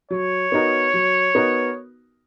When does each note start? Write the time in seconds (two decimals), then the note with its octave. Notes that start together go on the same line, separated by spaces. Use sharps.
0.11 F#3 C#5
0.52 B3 D#4 F#4 A#4
0.94 F#3
1.35 B3 D#4 F#4 A#4